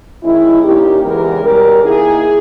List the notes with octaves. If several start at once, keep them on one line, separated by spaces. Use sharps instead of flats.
D#3 G#3 C#4 E4
A#2 A#3 C#4 D#4 G4
E2 C#3 E3 G#3 B3 G4 A#4
B2 G3 C#4 G4 A#4
D#3 A#3 D#4 E4 G#4